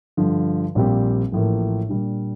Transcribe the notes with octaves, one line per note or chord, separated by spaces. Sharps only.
G2 D3 F3
A#1 A#2 G3 C4 G4
A1 A2 F3 A#3
A#2 G3 D4